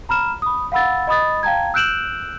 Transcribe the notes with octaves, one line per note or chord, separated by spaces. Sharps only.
A#5 B5 F6 E7
B5 D#6
F5 F#5 B5 E6 A6
D#5 B5 D#6 A6
F5 G5 A5 A#5 G#6
E6 F#6 G6 D7 E7 F#7